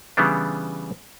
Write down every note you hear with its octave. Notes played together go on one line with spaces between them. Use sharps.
C#3 E3 G3 B3 D4